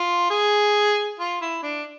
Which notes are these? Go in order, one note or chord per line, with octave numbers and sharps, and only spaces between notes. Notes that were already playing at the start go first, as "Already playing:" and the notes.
Already playing: F4
G#4
F4
E4
D4